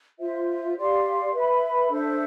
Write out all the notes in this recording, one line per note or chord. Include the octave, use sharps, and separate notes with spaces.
F4 C5 E5
G4 D5 F5 C6
B4 E5 B5
D4 A4 C5 E5